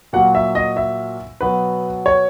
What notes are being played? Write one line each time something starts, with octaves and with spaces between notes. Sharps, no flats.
A#2 F#3 A#3 F#5
E5
D#5
E5
B2 F#3 B3 B4
C#5